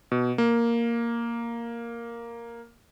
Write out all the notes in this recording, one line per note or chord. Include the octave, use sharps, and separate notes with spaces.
B2
A#3